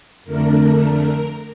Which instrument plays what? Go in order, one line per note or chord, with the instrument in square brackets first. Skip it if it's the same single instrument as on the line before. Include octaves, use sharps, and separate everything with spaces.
[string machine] F2 D3 A3 D4 A#4